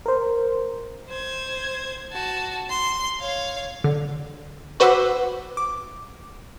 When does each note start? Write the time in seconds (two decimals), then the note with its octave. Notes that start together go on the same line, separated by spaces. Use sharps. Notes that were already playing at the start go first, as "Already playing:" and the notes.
0.06 A#4 C5
1.09 C5 G#6
2.12 F#4 A5
2.69 C6
3.20 C#5 F5
3.84 D3
4.80 F#4 B4 C5 F#5 D6 E6
5.57 D6